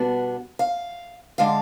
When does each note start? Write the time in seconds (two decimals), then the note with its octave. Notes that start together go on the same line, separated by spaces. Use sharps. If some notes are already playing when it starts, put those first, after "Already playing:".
Already playing: B2 G3 B3 D4
0.59 F5
1.38 D3 G#3 D4 F5